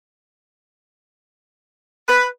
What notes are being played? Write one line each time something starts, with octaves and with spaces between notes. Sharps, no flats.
B4